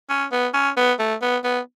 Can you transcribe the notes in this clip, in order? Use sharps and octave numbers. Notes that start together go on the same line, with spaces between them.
C#4
B3
C#4
B3
A3
B3
B3